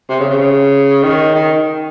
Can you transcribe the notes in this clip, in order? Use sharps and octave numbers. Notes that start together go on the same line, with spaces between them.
C3
C#3
C#3
D#3
D#3